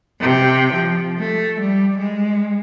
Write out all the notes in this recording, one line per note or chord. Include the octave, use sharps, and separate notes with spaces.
C3 G5
F3
A3
G3
G#3